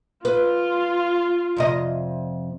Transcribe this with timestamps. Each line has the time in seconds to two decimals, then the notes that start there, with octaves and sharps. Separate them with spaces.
0.25 F4 B4
1.57 F2 C3 D#5